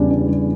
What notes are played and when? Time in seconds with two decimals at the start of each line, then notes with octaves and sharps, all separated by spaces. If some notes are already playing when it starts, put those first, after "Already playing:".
Already playing: E2 C#3 G3 D4
0.10 D4
0.28 G3